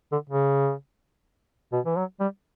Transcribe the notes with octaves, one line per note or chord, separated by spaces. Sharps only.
D3
C#3
B2
E3
F#3
G3